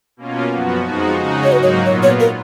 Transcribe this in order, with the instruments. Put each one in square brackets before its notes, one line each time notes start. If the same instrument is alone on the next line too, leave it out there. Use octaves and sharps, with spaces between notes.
[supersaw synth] B2 A#3 C#4 F4
F#2 F3 B3 F#4
F2 F3 G#3 D#4 F#4
C#3 G#3 D#4 F#4
[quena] C#5
[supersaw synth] G#2 F#3 A#3 D#4 F#4 [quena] B4
[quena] C#5
[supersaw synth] A#2 F#3 B3 F4 [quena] C#5
[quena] C#5
A#4